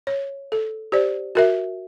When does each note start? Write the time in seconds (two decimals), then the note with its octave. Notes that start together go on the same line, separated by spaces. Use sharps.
0.07 C#5
0.52 A4
0.92 G4 C5 D5
1.35 F#4 A#4 E5